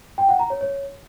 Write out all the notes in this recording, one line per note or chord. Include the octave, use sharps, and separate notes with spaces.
G5
F#5
A#5
C#5
C#5